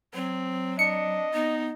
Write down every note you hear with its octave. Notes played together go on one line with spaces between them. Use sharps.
F#3 C4
D4 D#5 C#7
B3 D#4